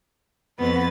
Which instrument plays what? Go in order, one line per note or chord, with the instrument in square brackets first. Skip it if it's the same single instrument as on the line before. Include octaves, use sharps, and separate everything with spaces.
[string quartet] F2 B4 A6 [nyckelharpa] B3